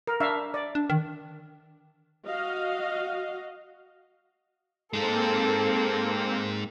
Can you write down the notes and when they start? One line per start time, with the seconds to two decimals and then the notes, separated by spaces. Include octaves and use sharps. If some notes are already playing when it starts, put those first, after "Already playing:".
0.07 A#4
0.20 D4 E5 F5
0.54 D5
0.75 D4
0.90 D#3
2.27 F#4 D#5 F5
4.93 G#3 A#3 C4 D#4 A4